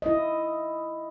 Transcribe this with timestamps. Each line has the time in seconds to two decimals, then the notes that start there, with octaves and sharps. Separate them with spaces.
0.02 E4 D#5